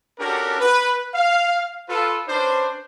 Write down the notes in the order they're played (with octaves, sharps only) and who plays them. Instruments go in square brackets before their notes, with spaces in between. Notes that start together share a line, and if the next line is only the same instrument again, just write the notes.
[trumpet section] C#4 D4 F#4 G4 A4 A#4
B4
F5
F4 A4 B4
C#4 D4 B4 C5